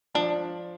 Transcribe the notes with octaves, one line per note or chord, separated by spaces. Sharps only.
F3 D4